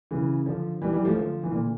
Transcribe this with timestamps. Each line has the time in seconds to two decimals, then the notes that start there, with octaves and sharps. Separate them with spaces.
0.11 C#3 E3
0.46 D3 F3
0.82 E3 G3
0.93 E3 G3
1.05 F3 A3
1.16 D3 F3
1.43 E3
1.52 A#2 D3